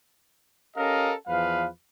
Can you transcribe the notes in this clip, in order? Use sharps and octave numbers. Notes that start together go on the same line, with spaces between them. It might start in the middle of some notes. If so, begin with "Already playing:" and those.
C#4 G4 A4 A#4 D#5 F5
E2 F3 B4 F5